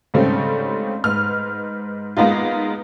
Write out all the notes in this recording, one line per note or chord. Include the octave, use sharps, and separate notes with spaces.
G#2 C#3 G3 A3 C4 C#4
G#2 B4 F6
G#3 A#3 B3 D#4 F4